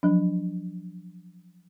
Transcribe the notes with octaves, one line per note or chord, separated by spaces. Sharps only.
F3 F#3 D4